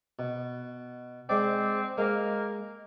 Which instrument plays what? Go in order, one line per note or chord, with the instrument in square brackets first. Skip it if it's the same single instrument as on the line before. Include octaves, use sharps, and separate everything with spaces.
[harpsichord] B2
[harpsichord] G#3 D5 [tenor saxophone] C4
[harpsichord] G#3 [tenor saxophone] A#3